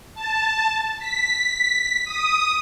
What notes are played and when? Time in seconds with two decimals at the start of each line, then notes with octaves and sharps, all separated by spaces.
0.15 A5
0.99 B6
2.05 D#6